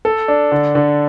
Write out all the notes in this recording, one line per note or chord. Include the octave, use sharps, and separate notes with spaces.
A4
D4
D3
D3